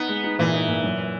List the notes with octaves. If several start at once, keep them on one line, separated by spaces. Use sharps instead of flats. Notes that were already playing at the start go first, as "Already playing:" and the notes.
Already playing: B3 D#4
G#3
D#4
A#2 E3
D#4
A#2
F#2